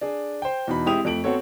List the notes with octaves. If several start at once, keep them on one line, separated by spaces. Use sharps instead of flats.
D4 G#4
C5 G5
E2 B2 D#4 B5
G#3 C4 E4 G4 D#6 F7
F2 A3 D7 F#7
B3 C4 F#4 A4 C#5